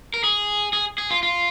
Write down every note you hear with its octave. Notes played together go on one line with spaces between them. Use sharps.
A#4
G#4
G#4
G#4
F4
F4